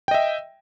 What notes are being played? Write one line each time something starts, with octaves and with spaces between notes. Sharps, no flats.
D#5 E5 G5